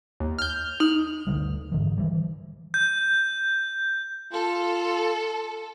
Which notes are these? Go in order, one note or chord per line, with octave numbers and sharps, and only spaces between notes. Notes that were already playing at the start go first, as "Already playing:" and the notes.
D#2
F6 G6
D#4 F6
D2 D3 D#3 G3
G#2 D3 E3
D#3 E3 G3
G6
F4 A4